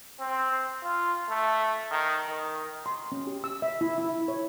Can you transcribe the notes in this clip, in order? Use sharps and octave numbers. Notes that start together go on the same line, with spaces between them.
C4
F4
A3
D#3
D#3
C6
C#4
G4
E6
E5
E4
E4
C#5